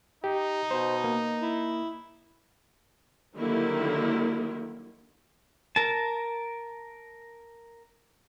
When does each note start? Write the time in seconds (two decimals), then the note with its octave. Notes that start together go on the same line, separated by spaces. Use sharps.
0.24 D#4 G4
0.71 B2 C5
1.04 A#3
1.42 E4
3.37 D3 D#3 F#3 G3 A#3 E4
5.76 A#4 A5